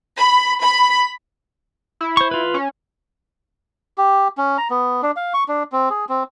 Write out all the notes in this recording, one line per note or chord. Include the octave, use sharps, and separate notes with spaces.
B5
B5
E4
C5 C#6
F4 B4
C#4
G4
C#4
A#5
B3
D4
F5
C#6
D4
C4
G#4
C4